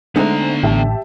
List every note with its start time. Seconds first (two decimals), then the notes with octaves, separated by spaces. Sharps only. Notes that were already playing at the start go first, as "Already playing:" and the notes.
0.16 D3 G#3 A3 B3 C4 D#4 F#5 A#5
0.63 A1 G4 E5 A5